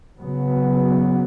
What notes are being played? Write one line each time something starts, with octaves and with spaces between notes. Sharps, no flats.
C#3 F#3 B3